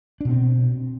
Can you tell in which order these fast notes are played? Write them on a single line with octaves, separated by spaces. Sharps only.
D4 B2 C4